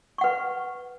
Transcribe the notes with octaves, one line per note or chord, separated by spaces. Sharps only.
B4 F#5 C#6